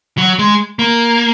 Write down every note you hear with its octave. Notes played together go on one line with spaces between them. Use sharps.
F#3
G#3
A#3